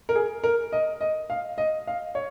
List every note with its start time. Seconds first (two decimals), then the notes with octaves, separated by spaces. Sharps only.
0.09 A#4
0.15 G#4
0.44 A#4
0.72 D#5
1.01 D#5
1.30 F5
1.58 D#5
1.87 F5
2.15 C#5